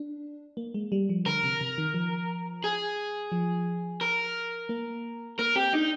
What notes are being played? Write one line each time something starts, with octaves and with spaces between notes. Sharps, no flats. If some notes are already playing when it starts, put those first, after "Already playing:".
Already playing: D4
A#3
G#3
G3
F3
D3 A#4
C3
C3
D#3
F3
G#4
F3
A#4
A#3
A#3 A#4
C4 G4
D4 D#4